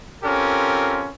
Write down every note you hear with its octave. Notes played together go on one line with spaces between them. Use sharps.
C4 C#4 F4 G4 A4 A#4